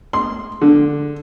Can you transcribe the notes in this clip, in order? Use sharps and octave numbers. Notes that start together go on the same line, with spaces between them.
C6
D3